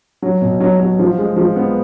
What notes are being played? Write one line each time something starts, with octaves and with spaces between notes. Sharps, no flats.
F#3
B2
F#3
F#3
F3
G#3
F3
B3